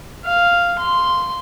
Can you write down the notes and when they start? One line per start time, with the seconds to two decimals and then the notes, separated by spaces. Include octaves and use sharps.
0.25 F5
0.79 C6